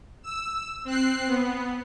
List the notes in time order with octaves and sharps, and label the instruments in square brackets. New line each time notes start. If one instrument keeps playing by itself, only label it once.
[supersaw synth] E6
C4 F#6 C7
B3